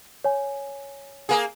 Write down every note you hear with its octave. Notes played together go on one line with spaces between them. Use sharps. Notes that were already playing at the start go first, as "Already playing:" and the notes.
C#5 G#5
A#3 G#4